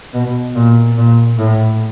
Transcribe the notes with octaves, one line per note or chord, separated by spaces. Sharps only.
B2
A#2
A#2
A2